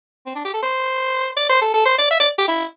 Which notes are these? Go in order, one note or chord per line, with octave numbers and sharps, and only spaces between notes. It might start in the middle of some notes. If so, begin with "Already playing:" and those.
C4
D4
G4
A4
C5
D5
C5
A4
A4
C5
D5
E5
D5
G4
E4